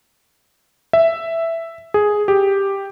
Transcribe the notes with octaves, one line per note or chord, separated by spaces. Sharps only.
E5
G#4
G4